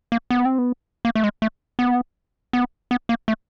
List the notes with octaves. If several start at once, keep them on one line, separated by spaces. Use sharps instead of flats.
A#3
B3
C4
B3
A#3
A3
G#3
A3
B3
B3
B3
A#3
A3